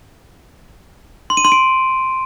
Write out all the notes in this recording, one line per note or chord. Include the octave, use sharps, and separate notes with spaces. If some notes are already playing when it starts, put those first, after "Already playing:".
C6
D#7
C6
D7